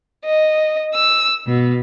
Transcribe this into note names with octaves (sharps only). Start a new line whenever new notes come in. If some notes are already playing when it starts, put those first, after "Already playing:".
D#5
E6
B2